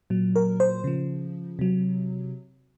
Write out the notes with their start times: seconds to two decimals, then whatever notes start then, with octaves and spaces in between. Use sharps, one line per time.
0.10 A#2 F#3
0.36 A#4
0.60 C5
0.84 C#3 F3
1.59 C3 F#3